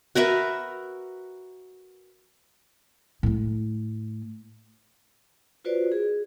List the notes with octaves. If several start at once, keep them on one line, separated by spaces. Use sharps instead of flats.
F#4 A#4 B4 E5
A2 A3
F4 F#4 B4 C5 D5
G#4